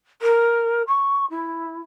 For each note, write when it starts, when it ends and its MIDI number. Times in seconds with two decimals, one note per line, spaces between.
0.21 0.82 70
0.87 1.25 85
1.30 1.81 64